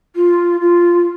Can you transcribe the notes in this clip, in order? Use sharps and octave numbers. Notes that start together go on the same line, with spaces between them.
F4
F4